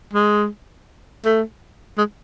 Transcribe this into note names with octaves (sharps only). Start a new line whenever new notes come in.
G#3
A3
G#3